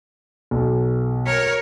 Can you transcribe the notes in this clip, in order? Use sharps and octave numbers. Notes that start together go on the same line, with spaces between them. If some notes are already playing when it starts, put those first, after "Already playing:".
B1
A#4 C#5